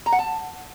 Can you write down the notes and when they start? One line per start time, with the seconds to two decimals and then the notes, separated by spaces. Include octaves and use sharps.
0.06 A#5
0.12 F#5
0.19 A5